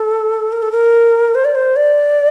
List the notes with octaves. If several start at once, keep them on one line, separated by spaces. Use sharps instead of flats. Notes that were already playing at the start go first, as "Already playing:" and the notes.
Already playing: A4
A#4
A4
A#4
C5
D5
C5
D5